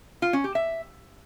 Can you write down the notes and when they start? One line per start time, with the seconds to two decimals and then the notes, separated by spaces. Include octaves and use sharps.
0.22 F4
0.33 C#4
0.44 G4
0.55 E5